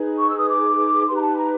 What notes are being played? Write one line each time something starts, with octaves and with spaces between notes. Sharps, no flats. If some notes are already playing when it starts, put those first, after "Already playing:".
Already playing: D#4 G#4 B4
C#6
E6
D#6
D6
D#4 G4 B4 C6
A#5
A5
A#5